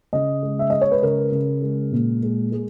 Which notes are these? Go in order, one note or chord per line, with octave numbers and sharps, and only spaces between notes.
C#3 D#5
G#3
E5
G#3 D#5
C#5
B4
C#3 A#4
C#3
G#3
A#2
G#3
G#3